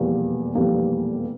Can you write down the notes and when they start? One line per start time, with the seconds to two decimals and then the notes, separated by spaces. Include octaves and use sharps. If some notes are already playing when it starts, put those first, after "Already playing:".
Already playing: F1 E2 B2 G3 A#3
0.55 F1 E2 B2 G3 A#3